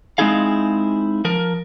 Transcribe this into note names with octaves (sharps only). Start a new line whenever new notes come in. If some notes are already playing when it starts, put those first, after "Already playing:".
G#3 C4 D#4 E4 G#4 F5
F3 A#4